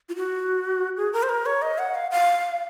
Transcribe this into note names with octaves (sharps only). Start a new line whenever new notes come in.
F4
F#4
G#4
A#4
C5
A#4
C#5
D#5
F#5
F5
F5